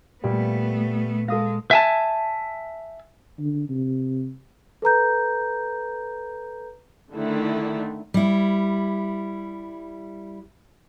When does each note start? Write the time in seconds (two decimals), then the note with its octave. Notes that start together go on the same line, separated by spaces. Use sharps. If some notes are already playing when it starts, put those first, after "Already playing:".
0.24 A#2 G3 A3 B3
1.28 G#3 A4 F5 D#6 A#6
1.71 E5 G#5 A5
3.38 D3
3.69 C3
4.82 A4 B4 A#5 G6
7.13 D3 D#3 A3 E4
8.14 G3 E4